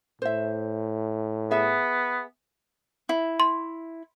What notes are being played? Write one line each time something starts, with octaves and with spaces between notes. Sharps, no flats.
A2 C5 E5
B3 G#4 E5
E4
C6